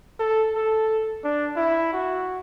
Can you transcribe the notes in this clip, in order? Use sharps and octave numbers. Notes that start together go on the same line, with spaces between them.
A4
A4
D4
E4
F#4